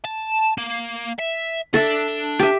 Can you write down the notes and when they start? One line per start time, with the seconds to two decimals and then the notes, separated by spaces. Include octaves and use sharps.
0.05 A5
0.58 A#3
1.19 E5
1.74 D4 A4 E5
2.39 G4 E5